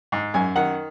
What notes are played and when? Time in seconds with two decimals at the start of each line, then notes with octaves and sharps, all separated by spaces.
0.12 G#2
0.34 F#2 G#5
0.56 D#3 F#5